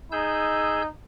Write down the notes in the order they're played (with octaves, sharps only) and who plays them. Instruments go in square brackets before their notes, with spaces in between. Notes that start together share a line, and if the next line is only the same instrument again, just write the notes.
[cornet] D#4 [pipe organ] G#4 E6 G6